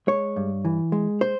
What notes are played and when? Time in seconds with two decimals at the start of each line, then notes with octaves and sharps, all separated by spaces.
0.07 G#3 C#5
0.36 G2
0.65 E3
0.92 G#3
1.21 C5